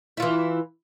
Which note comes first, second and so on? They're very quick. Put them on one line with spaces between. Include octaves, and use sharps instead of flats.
E4 F4 E3